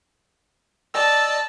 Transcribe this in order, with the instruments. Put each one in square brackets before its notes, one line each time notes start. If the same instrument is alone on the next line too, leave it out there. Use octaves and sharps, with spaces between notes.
[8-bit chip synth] D5 D#5 E6 [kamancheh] A5